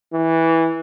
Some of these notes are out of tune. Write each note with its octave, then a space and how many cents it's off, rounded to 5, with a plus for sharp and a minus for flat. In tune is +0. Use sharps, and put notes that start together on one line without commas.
E3 -10